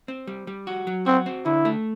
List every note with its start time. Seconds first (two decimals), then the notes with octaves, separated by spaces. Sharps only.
0.08 C4
0.27 G3
0.47 G3
0.67 F#4
0.87 F#3
1.06 C4 F#4
1.26 C4
1.46 D3 E4
1.65 A3